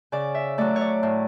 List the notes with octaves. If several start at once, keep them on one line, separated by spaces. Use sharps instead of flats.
C#3 D5
E5
F#3 A3 D5
C#5
D5
A2